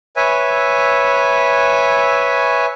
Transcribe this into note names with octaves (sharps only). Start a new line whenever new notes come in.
B4 C#5 E5 G#5